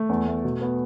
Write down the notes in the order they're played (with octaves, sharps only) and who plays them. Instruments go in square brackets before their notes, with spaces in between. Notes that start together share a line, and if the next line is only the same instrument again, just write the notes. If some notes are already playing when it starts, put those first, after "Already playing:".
Already playing: [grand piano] A3
E2
A3
B2
B3